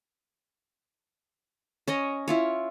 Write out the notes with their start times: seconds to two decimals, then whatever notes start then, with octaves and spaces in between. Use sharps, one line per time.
1.88 C#4 C#5 D#5
2.28 E4 F4 C#5